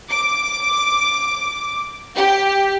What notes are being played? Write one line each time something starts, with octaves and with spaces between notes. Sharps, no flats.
D6
G4